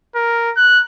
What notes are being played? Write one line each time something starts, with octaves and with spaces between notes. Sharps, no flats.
A#4
F#6